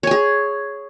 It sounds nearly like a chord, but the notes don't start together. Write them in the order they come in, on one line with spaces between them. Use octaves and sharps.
C#5 G#5 G#4